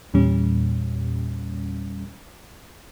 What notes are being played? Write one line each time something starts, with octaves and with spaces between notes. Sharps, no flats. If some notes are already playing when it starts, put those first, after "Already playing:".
E2 A#2 G3 C#4